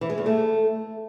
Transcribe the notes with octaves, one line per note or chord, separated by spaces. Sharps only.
E3
G#3
E2
A3